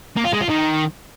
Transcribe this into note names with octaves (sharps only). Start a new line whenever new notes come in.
A#3
F4
G#3
F4
D#3